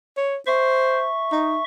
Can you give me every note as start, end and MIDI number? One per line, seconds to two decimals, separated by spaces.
0.17 0.36 73
0.47 1.07 72
0.47 1.64 76
0.47 1.64 85
1.32 1.57 63